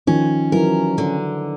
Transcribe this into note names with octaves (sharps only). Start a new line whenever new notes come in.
D#3 F3 C#4
E3 F#3 A#4
D3